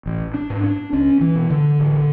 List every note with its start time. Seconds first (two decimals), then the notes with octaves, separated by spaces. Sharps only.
0.06 A1
0.34 D4
0.50 G#2
0.63 D4
0.93 C#2 C#4
1.21 E3
1.35 B2
1.50 D3
1.79 A1